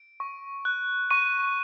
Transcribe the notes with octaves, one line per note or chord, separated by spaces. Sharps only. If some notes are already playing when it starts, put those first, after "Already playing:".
Already playing: D7
C#6
F#6
C#6 D#7